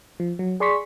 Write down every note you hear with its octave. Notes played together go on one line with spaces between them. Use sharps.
F3
F#3
G#4 D5 C6 C#6 B6